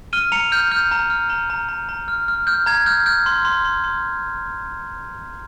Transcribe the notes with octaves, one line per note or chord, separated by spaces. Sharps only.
F6 D#7 G7
A#5 C#7 F7
F6 G6
F6 G6
A#5
F6
A#5
A#5
A#5
A#5
F6
F6
F6 G6
A#5 G#6
F6 G6
F6 G6
C6
C6
C6
C6